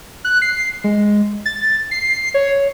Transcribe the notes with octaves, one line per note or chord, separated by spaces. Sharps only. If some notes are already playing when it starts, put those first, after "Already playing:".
F#6
C7
G#3
A6
C7
C#5